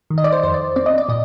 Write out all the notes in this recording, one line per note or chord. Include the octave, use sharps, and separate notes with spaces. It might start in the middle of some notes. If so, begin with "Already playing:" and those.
D#3
D#5
D5
C5
F2 C5
D5
C4 D5
D#5
D5
A#2 D#5